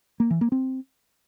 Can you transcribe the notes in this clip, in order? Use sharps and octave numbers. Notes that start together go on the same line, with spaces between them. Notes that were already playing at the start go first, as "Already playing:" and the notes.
A#3
E3
A#3
C4